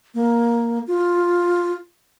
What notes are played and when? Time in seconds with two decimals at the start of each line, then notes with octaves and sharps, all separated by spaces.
0.14 A#3
0.87 F4